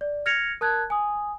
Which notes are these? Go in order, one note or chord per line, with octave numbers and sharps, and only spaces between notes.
D5
F6 G#6 A#6 C#7 F7
A#4 A5 F#6 G#6
G#5 D#6